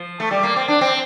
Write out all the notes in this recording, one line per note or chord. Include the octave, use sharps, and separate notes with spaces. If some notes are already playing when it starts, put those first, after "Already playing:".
Already playing: F3
A3
G3
A#3
C4
D4
C4